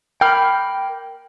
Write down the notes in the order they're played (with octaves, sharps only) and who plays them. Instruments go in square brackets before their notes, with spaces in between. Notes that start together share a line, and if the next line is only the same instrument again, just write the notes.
[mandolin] A#3 B5 F6 [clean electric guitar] G5